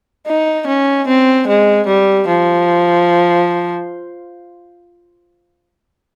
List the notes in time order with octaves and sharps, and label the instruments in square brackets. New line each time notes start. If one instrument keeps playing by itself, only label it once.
[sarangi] D#4
C#4
C4
G#3
G3
F3